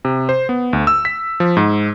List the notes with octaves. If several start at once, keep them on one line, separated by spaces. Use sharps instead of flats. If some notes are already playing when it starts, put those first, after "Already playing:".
C3
C5
B3
D2
E6
B6
F3
G#2